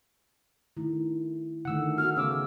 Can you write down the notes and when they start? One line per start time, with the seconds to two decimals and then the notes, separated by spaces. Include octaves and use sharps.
0.77 D#3 A3 E4
1.65 D3 D#3 A3 F#5 E6
1.98 B3 F#4 F6
2.17 C#3 A3 B3 C#5 D6 E6